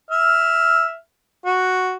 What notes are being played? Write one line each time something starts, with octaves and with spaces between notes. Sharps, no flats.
E5 F6
F#4